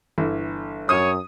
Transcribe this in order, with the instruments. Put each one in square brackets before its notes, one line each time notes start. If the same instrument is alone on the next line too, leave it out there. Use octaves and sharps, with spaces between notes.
[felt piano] G1 E3
[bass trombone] F#2 [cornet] C#5 [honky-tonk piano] D#6 D#7